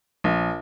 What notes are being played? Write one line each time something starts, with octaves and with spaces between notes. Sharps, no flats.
A#1